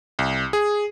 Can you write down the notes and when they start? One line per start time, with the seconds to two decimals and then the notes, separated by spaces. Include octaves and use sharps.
0.19 C2
0.53 G#4